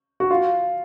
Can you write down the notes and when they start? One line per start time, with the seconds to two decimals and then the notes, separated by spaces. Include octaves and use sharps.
0.20 F#4
0.31 F4